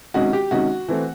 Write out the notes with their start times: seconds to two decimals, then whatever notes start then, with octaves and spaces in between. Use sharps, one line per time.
0.14 C3 D#3 G#3 C#4 F#4
0.33 G4
0.51 C3 D#3 G#3 C#4 F#4
0.89 E3 A3 C4